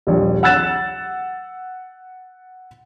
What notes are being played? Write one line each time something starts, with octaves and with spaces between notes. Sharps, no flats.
D#1 A#1 D#2
F#5 E6 F#6 A6 E7